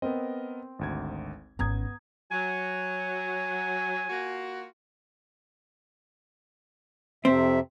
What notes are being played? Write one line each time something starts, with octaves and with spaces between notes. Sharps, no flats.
B3 C4 A#4 D#5
G#1 D2 G#6
G#1 B3 C#4 A#5 D#6 G#6
F#3 G#5
A#3 F4 F#4
F2 C3 C4 E5